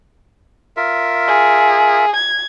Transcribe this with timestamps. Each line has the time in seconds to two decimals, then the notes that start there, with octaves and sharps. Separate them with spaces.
0.77 F4 A#4 E5
1.28 G#4
2.16 G#6